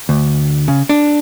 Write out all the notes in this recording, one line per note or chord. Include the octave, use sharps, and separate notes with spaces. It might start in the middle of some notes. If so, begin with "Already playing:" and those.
D2
C#3
D4